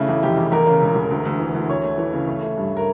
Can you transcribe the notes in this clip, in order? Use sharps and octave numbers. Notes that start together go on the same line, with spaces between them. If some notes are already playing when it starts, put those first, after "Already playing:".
Already playing: C#3 A3 E4
E2
F1 G4
E2
E2 A#4
C#3
E1
E2
D2
D2
E3
D2
D2 C#5
A3
E3
C#3
A3
A3
G2
A#4